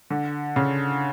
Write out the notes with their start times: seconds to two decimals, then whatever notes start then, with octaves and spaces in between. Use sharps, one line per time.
0.10 D3
0.56 C#3